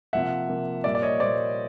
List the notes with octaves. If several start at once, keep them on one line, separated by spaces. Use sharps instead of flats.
C3 F3 A#3 E5 F#5
C3 F3 A#3
A#2 G3 A#3 D5 E5
D5
C#5 D#5
A#2 G3 A#3 C5 D5